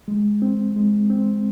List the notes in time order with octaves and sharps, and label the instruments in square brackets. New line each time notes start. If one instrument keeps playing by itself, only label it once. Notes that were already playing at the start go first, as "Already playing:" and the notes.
[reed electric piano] G#3
C4
G#3
C4